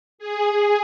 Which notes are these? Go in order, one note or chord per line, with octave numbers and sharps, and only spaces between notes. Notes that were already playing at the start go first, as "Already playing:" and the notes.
G#4